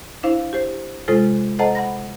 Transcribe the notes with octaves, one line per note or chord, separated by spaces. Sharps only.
D4 E4 C5 F5
G4 C5
C3 G#3 F4 A4 C5
A4 C5 D#5 F#5 A5 A#5
F#5 B5 A#6